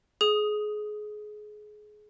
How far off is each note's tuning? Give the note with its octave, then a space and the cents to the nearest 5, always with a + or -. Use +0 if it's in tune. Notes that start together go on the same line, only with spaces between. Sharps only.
G#4 +25 D#6 +0